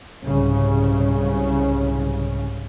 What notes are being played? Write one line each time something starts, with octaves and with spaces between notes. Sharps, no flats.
C2 G#2 C#3